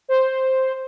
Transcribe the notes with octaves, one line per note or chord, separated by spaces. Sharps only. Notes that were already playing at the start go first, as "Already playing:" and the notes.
C5